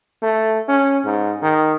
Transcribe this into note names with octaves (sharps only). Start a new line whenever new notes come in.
A3
C#4
G#2
D#3